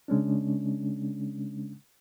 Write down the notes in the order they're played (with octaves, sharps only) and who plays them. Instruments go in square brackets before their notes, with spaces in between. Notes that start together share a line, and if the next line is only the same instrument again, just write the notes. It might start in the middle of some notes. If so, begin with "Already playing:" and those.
[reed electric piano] C#3 G#3 C#4 D4